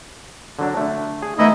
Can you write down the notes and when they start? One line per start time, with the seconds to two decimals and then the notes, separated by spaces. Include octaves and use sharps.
0.59 D3 F#3 D4
0.77 D3 A3
1.22 G#4
1.38 D3 E3 A3 B3 D#4 E4